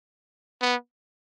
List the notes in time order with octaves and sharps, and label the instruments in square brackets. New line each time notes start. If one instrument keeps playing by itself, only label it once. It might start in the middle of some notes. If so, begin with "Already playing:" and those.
[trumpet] B3